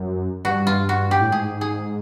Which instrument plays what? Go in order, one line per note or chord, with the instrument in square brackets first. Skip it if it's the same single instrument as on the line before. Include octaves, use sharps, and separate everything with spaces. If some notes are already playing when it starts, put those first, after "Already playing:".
Already playing: [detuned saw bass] F#2
[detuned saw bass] G2 [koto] F#4
[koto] F4
F#4
G4
[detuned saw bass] A2
[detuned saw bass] G#2 [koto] G#4
[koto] G#4